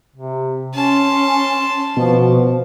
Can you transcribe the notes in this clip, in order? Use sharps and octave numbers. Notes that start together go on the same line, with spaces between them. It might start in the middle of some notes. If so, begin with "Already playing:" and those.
C3
C#4 A5 C6
B2 F3